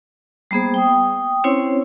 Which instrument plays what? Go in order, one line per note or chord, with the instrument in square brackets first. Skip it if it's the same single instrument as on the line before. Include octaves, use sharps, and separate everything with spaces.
[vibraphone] G3 A#3 B3 G#4 C5
G5 D#6
C4 C#4 E4 C5 C#5